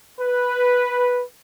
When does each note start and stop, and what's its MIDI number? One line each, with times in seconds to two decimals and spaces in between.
0.19 1.21 71